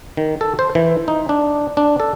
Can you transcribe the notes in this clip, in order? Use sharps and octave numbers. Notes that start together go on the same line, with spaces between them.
D#3
A4
C5
E3
D#4
D4
D4
A4